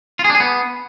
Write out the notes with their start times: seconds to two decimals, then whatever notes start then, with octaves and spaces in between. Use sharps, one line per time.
0.19 F4
0.24 G#4
0.30 D4
0.35 G#4
0.40 B3